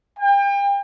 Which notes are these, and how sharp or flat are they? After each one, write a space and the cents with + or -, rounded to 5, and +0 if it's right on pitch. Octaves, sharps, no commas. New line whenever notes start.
G5 +35